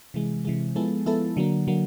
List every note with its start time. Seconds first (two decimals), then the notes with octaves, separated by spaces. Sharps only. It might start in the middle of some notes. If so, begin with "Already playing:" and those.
0.14 C3 E3 G#3
0.45 C3 E3 G#3
0.76 F3 G#3 B3 E4 A4
1.06 F3 G#3 B3 E4 A4
1.37 D3 F#3 A#3
1.67 D3 F#3 A#3